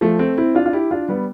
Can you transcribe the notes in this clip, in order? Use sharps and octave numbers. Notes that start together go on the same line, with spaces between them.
F3 A3
A3 C4
C4 E4
D4 F4
F4
E4 G4
D4 F4
G3 B3